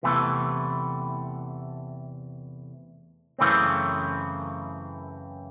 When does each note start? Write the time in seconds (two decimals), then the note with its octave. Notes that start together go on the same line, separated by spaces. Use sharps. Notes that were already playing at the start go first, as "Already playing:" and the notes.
0.03 E2 C3 E3 A3
3.39 F#2 C#3 E3 A3 C4